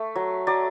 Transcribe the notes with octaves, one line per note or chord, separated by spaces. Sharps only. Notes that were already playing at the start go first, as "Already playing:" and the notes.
Already playing: A3
F#3
F#3 D5